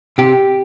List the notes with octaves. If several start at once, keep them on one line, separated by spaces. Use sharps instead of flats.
C3 G4